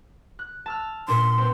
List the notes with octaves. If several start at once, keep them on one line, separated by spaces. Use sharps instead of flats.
F#6
A5 E6 F6
A#2 D4 C6
B3 C4